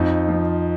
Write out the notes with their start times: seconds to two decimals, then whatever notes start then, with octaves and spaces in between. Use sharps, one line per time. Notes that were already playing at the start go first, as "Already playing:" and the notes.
Already playing: F2 D#4
0.28 F3